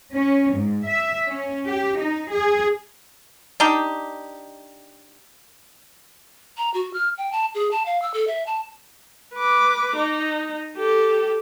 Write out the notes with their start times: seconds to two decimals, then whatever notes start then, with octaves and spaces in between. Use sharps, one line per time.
0.15 C#4
0.55 G#2
0.87 E5
1.28 C#4
1.68 G4
2.00 D#4
2.31 G#4
3.60 D4 D#4 G4
6.57 A#5
6.74 F#4
6.93 F6
7.18 G5
7.32 A5
7.55 G#4
7.71 A5
7.86 F5
8.02 E6
8.14 A4
8.27 E5
8.46 A5
9.34 B4 D6
9.96 D#4
10.76 G4 A4